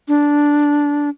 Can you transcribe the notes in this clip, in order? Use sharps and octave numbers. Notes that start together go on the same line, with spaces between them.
D4